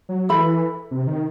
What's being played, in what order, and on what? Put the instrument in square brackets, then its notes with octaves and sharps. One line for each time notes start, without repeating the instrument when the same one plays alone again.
[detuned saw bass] F#3
[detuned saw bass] E3 [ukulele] A4 E5 B5
[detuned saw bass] C3
D#3